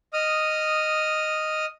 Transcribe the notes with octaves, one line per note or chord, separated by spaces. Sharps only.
D#5 D#6 F6